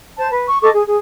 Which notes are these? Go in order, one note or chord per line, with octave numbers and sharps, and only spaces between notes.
C5 A5
B4
C#6
A4 D#5 C#6 D6
G#4
G#4